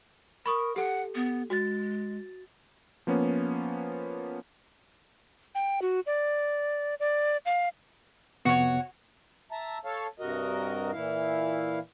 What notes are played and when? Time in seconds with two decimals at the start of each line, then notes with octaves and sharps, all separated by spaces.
0.46 A#4 B5 C#6 D#6
0.76 G4 A4 F#5
1.15 B3
1.50 G#3 F#4 A6
3.07 F3 A#3 B3 C#4
5.55 G5
5.82 F#4
6.06 D5
7.00 D5
7.46 F5
8.45 F2 C3 B3 F#4 C#5
9.52 E5 A5 A#5
9.85 A4 C#5 F5 A5
10.19 G2 C3 F#4 A#4 D#5
10.92 A#2 E3 E4 F5